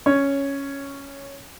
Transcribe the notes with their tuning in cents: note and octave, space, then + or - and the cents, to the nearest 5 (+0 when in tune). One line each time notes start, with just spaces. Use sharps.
C#4 +0 C#5 +5